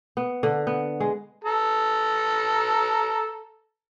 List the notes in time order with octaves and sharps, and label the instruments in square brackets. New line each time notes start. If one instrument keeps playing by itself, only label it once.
[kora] B3
D3
B3
G#3
[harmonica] A4 A#5